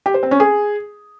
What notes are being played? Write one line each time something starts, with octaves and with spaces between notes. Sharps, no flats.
G4
C5
C4
C#4
G#4